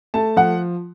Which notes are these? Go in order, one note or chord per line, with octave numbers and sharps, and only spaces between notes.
A3 A5
F3 F#5